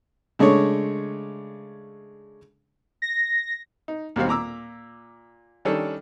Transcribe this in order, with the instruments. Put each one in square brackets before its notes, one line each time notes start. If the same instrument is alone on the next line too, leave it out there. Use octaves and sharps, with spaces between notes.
[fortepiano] C#3 G#3 A3 D4 C#5
[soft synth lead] A#6
[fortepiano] D#4
D#2 B2 G3 C4 F5
A#2 A#5 D6 E6
D#3 G3 C#4 D4 A4